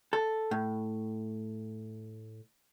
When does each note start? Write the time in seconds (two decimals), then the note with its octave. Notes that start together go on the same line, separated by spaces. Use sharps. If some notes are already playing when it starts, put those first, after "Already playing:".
0.13 A4
0.51 A2